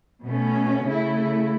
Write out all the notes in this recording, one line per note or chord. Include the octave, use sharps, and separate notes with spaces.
B2 A3 C#4
C#3 A3 E4